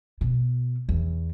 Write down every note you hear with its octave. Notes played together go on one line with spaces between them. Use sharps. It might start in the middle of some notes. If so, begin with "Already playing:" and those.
B2
E2